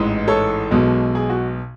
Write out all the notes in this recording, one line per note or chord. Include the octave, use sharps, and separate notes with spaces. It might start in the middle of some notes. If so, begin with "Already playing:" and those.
Already playing: A1 G#2 E3 G#3
A4 C#5
B1 B2 G#3
G#4
F#4